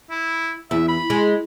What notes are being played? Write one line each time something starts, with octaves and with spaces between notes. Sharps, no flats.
E4
E2 E5
B5
G#3